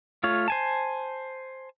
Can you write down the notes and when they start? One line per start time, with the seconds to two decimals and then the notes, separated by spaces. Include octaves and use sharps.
0.24 A3 F4 C#5
0.48 C5 G#5 A5